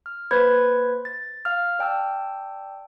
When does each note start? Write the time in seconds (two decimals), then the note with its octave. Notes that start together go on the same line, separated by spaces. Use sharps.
0.06 F6
0.31 A#3 B4 C5 B5 G#6
1.05 A6
1.45 F5 F6
1.79 D5 G5 A5 E6